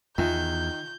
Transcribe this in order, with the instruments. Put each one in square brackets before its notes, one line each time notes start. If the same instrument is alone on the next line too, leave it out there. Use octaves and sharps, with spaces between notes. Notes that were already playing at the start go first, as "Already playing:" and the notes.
[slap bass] E2 [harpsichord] D#3 [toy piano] F4 E5 G#5 [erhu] G6